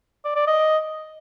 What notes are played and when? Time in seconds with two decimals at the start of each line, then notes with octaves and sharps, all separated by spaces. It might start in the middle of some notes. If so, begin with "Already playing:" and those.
0.25 D5
0.36 D5
0.47 D#5